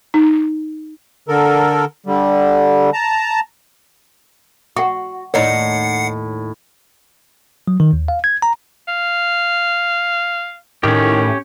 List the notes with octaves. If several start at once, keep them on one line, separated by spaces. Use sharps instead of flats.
D#4
D3 A4 A#4
D3 G3
A5 A#5
F#4 F#5 C#6
D#2 A2 D#4 C#5 F#5 C7 C#7
F#3
D#3
D#2
F5
G#6
A#5
F5
A2 D#3 C#4 G4